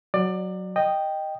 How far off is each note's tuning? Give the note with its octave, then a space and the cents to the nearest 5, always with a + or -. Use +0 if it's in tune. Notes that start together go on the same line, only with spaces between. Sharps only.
F#3 +0 D5 +25
D#5 -10 G5 +0